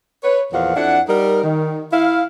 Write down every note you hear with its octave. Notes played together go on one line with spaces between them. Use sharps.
B4 C#5
E2 A#2 F3 F5 F#5
F2 D4 E4 F#5
G3 D#4 A#4
D#3
E4 F5